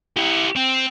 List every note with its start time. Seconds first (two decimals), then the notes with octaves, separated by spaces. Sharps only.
0.17 E4 G4
0.56 C4